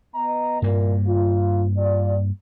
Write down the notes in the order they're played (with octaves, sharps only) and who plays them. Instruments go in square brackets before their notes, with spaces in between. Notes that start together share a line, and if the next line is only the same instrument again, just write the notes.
[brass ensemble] B3 D#5 A#5
[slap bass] G2 A#3 [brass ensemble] A#2
[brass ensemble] F4
F4 D5